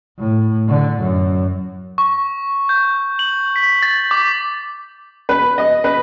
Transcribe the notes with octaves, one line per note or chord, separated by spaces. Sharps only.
A2
D3
F#2
C#6
G6
F#7
B6
A6
D6
B4
D#5
B4